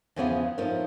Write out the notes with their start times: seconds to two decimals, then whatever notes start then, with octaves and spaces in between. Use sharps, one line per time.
0.16 E2 C#3 F3 B3 G4 G#4
0.58 A2 F3 D#4 A#4